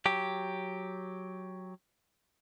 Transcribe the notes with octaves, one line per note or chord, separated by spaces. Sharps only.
F#3 G4